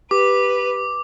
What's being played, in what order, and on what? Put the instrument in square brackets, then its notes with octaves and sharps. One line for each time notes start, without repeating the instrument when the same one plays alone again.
[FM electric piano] G4 [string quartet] B4 [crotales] D6